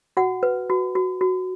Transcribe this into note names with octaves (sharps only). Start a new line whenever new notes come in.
F#4 F#5
B4
F#4
F#4
F#4